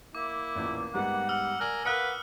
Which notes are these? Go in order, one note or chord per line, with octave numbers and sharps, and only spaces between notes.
A#3 E4 D6
A1 E2 A#2
G#2 G3 B3 F#5
F#5 E6 F6
A#4 D5 G#5 F#7
A#4 B4 F5 F#5 D#6 E6 F#6 C#7